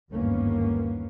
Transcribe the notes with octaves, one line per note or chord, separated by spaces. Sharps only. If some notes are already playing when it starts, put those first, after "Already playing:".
G1 D#2 G#2 A#3 B3 C#4